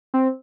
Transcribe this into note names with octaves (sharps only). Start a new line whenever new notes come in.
C4